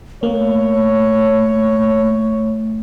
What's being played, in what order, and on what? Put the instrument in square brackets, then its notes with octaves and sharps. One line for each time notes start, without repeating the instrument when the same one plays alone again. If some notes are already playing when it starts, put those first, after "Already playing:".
[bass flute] A3 [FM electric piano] A#3 [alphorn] C#5